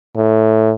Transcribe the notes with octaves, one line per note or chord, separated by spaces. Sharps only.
A2